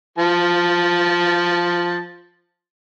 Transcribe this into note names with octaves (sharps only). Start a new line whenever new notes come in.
F3 A5